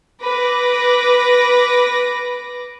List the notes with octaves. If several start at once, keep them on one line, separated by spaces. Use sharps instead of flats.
B4 D6 A#6